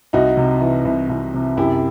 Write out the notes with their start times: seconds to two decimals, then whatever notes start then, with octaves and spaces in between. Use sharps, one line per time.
0.13 C2 D#4 F#4
0.37 C3
0.61 E3
0.85 C2
1.09 C2
1.34 C3
1.57 F#2 E4 G4